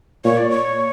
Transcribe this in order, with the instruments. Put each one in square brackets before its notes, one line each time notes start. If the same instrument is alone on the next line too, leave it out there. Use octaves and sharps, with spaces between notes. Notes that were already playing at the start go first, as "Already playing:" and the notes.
[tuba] A#2 [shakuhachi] C#5
[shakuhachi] D5
C#5